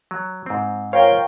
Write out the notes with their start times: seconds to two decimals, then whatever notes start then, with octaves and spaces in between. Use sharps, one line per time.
0.11 F#3
0.46 G#2 C4
0.93 F4 A#4 C5 C#5 F5 G5